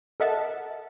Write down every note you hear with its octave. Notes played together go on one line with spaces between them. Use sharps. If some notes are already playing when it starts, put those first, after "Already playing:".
A4 A#4 D#5 E5 F#5 A5